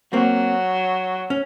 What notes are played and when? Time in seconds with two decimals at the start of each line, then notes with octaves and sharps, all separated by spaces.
0.13 F#3 A#3 C4
1.30 C#4